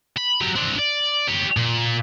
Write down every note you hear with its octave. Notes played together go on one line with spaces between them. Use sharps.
B5
F#3 G4
C4 D4
D5
G4 C#5
A#2